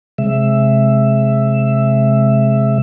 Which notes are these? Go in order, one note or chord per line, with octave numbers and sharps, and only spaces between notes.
C3 G#3 E5